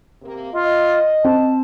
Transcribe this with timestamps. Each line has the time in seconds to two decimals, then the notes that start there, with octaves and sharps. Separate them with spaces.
0.22 C3 A#3
0.53 F4 D#5
1.24 C4 A5